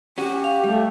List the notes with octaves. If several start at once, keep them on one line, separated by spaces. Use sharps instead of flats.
C#4 F#4 G4
F5
G3 A3